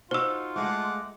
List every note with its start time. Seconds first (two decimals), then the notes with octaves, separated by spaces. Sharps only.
0.11 D#4 F4 F#4 C5 E6
0.56 G#3 A3 F#5 D6